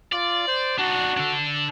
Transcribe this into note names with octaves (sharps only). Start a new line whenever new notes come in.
F4 D5
C5
D4 D#4 F#4
D4 A4